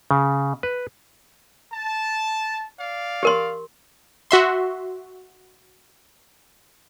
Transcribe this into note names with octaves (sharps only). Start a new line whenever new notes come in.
C#3
B4
A5
D5 F5
G4 A#4 C6
F#4 E5 C6